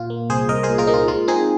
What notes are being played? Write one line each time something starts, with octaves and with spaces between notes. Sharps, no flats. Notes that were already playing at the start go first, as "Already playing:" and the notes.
Already playing: A#2 F4
A#3
C2 G#4 C5
C2 A#4 D#5
G#4 C5
A#2
F4 A#4
A#3 D#4
F4
G#3 F4
C4 D#4 G#4